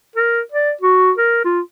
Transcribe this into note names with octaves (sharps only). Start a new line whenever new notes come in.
A#4
D5
F#4
A#4
F4